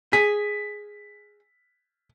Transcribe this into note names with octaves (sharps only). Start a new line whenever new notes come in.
G#4 B6